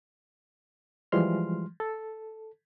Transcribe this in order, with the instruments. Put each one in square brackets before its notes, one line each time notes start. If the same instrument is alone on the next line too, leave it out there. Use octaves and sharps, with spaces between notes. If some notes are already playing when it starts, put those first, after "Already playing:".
[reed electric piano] E3 F3 G3 G#3 C6 F6
A4